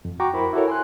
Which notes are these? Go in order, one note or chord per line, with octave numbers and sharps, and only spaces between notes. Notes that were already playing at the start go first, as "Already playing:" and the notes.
F2
F#4 G5 A#5 C#6 D6
E4 A#4 C5 B5
E4 F#4 A4 A#4 C#5
G#5 C6 F#6